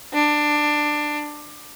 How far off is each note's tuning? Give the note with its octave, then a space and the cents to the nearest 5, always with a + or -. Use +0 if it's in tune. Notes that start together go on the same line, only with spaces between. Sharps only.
D4 +15